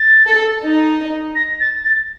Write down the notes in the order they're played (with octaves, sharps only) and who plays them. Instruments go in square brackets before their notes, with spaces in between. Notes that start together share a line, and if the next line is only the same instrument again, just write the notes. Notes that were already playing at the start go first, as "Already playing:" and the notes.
Already playing: [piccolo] A6
[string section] A4
D#4
[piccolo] A#6
A6
A6